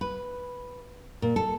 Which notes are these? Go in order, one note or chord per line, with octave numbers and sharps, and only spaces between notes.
B4
A#2
A4